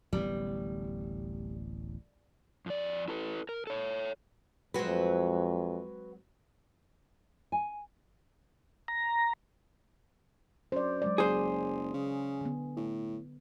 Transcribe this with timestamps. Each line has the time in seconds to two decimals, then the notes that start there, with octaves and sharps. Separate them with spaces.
0.13 D1 A1 G3 B3
2.66 F2 D5
3.08 E4 A4 B4
3.49 A#4
3.67 A4 C#5
4.74 F2 F#3 G#3 C4 F#4 B4
7.52 G#5
8.88 A#5
10.72 F#2 C5 D5
11.02 F#3 G#3 D5
11.18 F#1 G#4 C5
11.94 C#3
12.41 D3 B3
12.77 A2